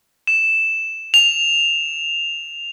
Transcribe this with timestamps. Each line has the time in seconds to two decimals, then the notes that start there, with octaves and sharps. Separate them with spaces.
0.27 E7
1.14 F7